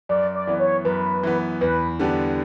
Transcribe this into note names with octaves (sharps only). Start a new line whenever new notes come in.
F#2 D5
D5
E3 B3
C#5
F#2 B4
E3 B3
E2 B4
D3 G3 B3 D4